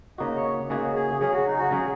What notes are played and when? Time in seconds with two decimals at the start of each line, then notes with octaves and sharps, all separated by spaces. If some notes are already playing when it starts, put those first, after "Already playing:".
0.18 C#3 A#3 D#4 F#4 D#5
0.36 C#5
0.69 C#3 A#3 D#4 F#4 G#4
0.95 G#4
1.21 C#3 F#3 C#4 G#4
1.33 F#4
1.46 D#4
1.58 F#4
1.71 C#3 F#3 C#4 G#4